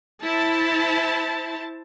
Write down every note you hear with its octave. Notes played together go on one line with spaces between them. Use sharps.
E4 C5 A5